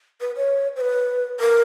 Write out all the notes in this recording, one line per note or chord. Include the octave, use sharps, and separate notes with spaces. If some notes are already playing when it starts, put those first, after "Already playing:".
B4
C#5
C5
B4
A#4